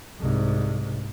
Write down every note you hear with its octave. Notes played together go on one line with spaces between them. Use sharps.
C2 G#2